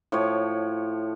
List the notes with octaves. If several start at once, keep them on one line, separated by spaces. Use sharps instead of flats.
A2 F3 C#5